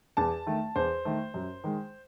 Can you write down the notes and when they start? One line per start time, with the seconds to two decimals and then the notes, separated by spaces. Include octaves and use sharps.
0.17 E2 A5
0.46 D#3 A3
0.76 E2 C5
1.05 D#3 A3
1.34 F#2
1.64 D#3 G#3